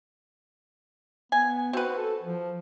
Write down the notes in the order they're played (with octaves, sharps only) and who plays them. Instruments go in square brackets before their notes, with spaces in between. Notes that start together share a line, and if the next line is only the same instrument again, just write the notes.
[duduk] B3 [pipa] G#5
[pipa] C4 B4 [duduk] F#4
[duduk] A4
F3